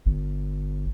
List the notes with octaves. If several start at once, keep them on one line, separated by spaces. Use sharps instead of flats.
G1